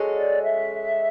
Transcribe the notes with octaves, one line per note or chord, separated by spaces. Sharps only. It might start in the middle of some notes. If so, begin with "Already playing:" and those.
Already playing: G#3 C#4 F#4 A4
D5
E5